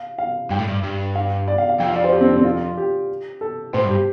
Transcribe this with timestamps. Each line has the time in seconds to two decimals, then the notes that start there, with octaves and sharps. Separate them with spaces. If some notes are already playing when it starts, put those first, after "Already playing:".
Already playing: F5
0.18 F5
0.50 G2 G5
0.59 A2
0.68 G2
0.83 G2
1.15 F5
1.48 D5
1.58 F5
1.69 F5
1.80 F2 G5
1.88 F5
1.95 D5
2.04 C5
2.12 G4
2.21 C4
2.28 D4
2.36 C4
2.45 F4
2.77 G4
3.41 A4
3.73 A2 C5
3.85 G2
3.90 G4